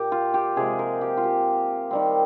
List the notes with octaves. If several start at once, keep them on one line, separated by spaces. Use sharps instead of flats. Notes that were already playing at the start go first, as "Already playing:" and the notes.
Already playing: A#2 A#3 G4
F4
G4
C3 F3 G#3 G#4
A#4
G4
F4
G4
D#3 G3 C4